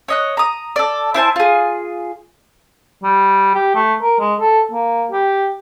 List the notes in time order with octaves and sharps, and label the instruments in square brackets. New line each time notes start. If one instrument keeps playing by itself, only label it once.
[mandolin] C#5 D#5 F#6
A#5 D#6
A4 D5
E4 C5 G#5 A5
F4 G#4
[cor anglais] G3
G4
A3
A#4
G#3
A4
A#3
G4